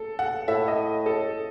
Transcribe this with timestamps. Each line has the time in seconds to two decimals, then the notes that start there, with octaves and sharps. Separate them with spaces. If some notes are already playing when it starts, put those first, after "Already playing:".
Already playing: A4
0.19 F#5
0.48 A2 E5
0.68 D#5
1.06 A4